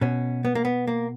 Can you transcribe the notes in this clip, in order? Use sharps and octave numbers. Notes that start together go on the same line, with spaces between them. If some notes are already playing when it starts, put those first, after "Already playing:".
B2 C#4
B3
A#3
B3
A#3